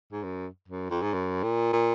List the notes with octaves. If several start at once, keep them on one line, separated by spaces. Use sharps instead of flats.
G#2
F#2
F#2
F2
G#2
F#2
A#2
A#2